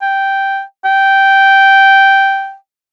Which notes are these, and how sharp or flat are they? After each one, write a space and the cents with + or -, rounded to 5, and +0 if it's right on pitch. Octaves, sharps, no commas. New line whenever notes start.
G5 -5
G5 -10